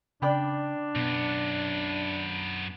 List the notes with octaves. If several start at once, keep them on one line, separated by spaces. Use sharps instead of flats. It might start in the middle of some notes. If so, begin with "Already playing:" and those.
C#3 D4 D5 G5 B5
F#2 B2 B3